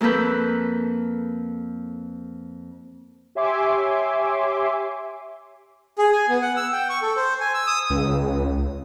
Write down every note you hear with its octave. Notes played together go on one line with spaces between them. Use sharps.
F2 A#3 A4 B4 G6
G4 C#5 E5 G#5 C6 D6
G#4
G#5
B3
F#5
E6
G5
C#6
A4
C5
G#5
E6
D#6
C#2